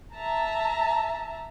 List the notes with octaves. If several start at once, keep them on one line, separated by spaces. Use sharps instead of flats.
E5 A5 A#5